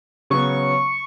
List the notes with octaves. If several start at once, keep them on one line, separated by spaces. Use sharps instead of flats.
C#3 F#3 B3 C#6